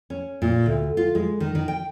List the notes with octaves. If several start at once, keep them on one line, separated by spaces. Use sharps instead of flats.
C#4
A#2
D2
F4
G#3
D#3
D#3
G5